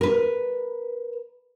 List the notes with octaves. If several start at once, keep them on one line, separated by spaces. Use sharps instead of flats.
A#4 B4